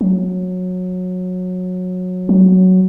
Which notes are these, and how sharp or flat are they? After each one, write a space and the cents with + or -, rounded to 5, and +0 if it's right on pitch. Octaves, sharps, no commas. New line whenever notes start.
F#3 -20
F#3 +5